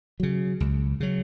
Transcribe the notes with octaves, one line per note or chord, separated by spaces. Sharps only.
C#3 F#3
C#2
C#3 F#3